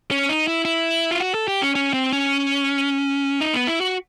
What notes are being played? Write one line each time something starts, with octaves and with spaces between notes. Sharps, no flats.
C#4
D#4
E4
E4
F4
F#4
A4
G4
C#4
C#4
C4
C#4
D#4
B3
E4
F#4